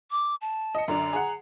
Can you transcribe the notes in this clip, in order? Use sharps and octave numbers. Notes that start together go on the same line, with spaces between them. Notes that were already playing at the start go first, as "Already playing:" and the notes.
D6
A5
D#5 C#7
F#2 D3 D5 A#5
G#4 F#5